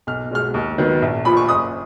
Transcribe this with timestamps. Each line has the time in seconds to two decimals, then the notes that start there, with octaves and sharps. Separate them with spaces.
0.07 B1 F6
0.31 B2 G#3 F6
0.54 D#2
0.78 D#3 F#3 B3
1.02 A#1
1.25 A#2 F3 B5
1.37 C#6
1.49 F#1 D#6